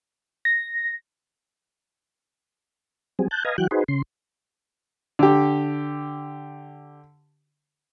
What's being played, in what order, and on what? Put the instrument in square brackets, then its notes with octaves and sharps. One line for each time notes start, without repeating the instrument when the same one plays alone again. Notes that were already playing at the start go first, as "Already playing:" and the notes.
[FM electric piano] A#6
[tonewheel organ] F#3 G3 C4 G#4
A5 F#6 G6
B4 D#5 F5 G#5 A#5
E3 F#3 F#4 G5 F#6
D#4 F#4 G#4 B4 C5
C#3 C6
[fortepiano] D3 G4